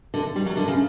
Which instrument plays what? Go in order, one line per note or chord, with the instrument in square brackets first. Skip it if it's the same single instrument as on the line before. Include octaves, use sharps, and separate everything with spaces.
[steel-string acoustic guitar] D3
G3
F#3
D3
C#3